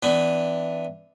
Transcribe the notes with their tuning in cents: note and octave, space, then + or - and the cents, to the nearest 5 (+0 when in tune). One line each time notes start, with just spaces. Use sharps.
E3 +0 B3 +40 D4 +0